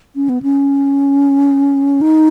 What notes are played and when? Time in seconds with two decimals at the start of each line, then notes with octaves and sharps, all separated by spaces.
0.16 C#4
0.29 B3
0.42 C#4
2.01 D#4